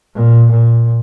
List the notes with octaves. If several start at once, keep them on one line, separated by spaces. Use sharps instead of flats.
A#2
A#2